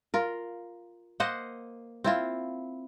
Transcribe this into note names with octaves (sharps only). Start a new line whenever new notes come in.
F4 A#4
A#3 C5 D#5 F#5
C4 E4 F4